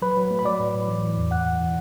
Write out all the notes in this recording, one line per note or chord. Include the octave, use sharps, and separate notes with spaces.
F#3 B4 B5
F#3
A3
B5
F#3 D5 D6
A2
A2
E3
E3
E2
F#2 F#5 F#6
E3
E3